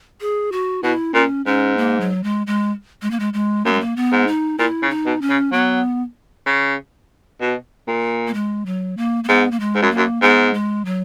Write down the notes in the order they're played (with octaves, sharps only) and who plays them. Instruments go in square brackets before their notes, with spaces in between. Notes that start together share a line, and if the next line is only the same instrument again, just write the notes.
[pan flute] G#4
F#4
[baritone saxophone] B2 [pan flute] E4
[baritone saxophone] A#2 [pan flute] C#4
[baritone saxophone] G#2 [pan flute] C#4
[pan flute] A#3
F#3
G#3
G#3
G#3
A#3
G#3
G#3
[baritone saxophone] F#2 [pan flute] A#3
[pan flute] G#3
A#3
B3
[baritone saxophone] G#2
[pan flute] D#4
[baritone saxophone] A#2 [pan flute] E4
[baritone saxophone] C#3
[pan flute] D#4
[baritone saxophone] B2
[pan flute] C#4
[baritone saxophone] C#3
[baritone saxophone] F#3 [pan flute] B3
[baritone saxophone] C#3
B2
A#2
[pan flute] A#3
G#3
F#3
A#3
A#3
[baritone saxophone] G#2 [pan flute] B3
[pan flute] A#3
G#3
[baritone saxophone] G#2
F#2
[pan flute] A#3
[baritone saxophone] F#2
[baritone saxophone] G#2 [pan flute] B3
[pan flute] G#3
F#3